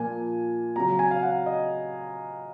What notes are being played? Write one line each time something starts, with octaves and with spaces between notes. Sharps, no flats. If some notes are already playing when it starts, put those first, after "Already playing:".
Already playing: A#2 F3 A#3 G#5
C#3 F#3 C4 A#5
G#5
F5
F#5
D#5